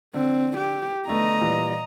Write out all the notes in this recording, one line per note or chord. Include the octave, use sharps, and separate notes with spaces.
D3 C4
G4
D3 A3 B3 D#5 A#5
A#2 E3 G3